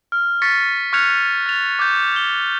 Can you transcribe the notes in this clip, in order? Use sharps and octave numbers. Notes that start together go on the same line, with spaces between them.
F6
C#6 A6 B6 C#7
C#6 F6 F#6 G#6 C#7 F7
A6 F7
D6 G6
G7